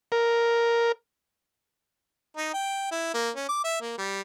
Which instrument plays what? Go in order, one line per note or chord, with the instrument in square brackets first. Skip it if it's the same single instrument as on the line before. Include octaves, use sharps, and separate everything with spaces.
[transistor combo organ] A#4
[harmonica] D#4
G5
E4
A#3
C#4
D6
E5
A#3
G3